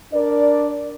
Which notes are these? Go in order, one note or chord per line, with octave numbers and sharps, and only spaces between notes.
D4 A#4 D5